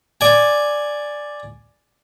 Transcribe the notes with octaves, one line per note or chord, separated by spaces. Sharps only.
D5 G#5